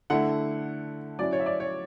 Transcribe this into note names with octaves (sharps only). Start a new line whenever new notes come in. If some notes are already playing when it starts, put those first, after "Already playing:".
D3 A3 E4 F#5
F#3 C#4 E4 D5
C#5
E5
D5
C#5